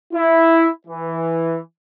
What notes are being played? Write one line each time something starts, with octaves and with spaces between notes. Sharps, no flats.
E4
E3